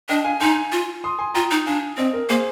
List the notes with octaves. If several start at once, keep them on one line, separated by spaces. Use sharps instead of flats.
D4 D#5 G5
F5 G#5
D#4 G#5 C6
F4
C6 D#6
G#5 C6
F4 G5 A#5
D#4
D4 F5 G#5
C4 C5 D#5
A#4
A#3 G#4 C5